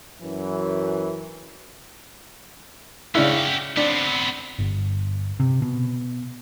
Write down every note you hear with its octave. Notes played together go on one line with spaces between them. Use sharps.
F#2 E3
C#3 D4 E4 G4 F#5
B3 C4 D4
G1
C3
B2